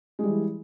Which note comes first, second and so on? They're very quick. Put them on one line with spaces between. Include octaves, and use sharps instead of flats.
G#3 G3 E3